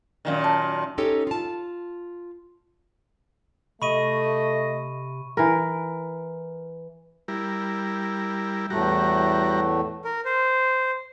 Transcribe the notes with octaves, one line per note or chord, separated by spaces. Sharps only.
F#2 A#2 D#3
A5
C#4 D#4 G4 A4 C#5
F4 A5
C3 A3 D#5 B5 C#6 D#7
E3 A#4
G3 E4 A#4
E2 A2 G3 A3 F#4 A#5
A#4
C5